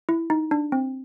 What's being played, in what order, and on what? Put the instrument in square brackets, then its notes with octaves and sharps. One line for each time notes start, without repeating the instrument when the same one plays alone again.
[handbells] E4
D#4
D4
C4